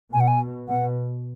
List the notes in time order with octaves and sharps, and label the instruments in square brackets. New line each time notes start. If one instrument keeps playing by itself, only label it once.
[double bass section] B2 [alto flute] G#5
[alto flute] F#5
G#5
[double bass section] B2 [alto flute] F#5